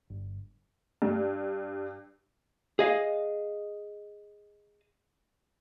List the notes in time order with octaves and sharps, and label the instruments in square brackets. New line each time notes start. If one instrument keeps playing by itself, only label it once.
[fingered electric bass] G1
[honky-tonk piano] G2
[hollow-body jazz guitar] G#4 D#5 F5